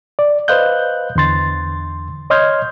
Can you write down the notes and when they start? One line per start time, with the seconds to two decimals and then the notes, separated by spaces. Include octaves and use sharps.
0.19 D5
0.48 B4 C5 D#5 F5 F#6 G6
1.16 E2 D3 C6 A6
2.30 C#5 D#5 C6 F6 G6 G#6